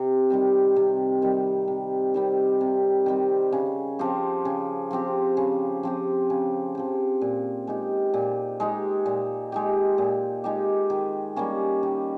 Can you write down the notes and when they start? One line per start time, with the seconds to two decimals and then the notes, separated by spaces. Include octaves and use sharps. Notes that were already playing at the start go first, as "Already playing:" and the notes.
Already playing: C3
0.30 D#3 G3 C4
0.76 C3
1.22 D#3 G3 C4
1.68 C3
2.14 D#3 G3 C4
2.61 C3
3.06 D#3 G3 C4
3.52 C#3
3.99 F3 C4 G4
4.45 C#3
4.91 F3 C4 G4
5.37 C#3
5.83 F3 C4 G4
6.30 C#3
6.75 F3 C4 G4
7.21 A#2
7.67 G#3 D#4 G4
8.14 A#2
8.60 G#3 D#4 G4
9.06 A#2
9.52 G#3 D#4 G4
9.98 A#2
10.44 G#3 D#4 G4
10.90 D#3
11.36 G3 A#3 C#4
11.83 D#3